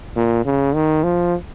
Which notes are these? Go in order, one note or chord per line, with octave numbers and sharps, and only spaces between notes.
A#2
C#3
D#3
F3